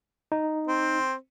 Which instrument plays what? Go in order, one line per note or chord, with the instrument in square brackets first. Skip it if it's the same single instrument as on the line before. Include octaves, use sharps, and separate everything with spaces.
[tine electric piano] D#4
[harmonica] C4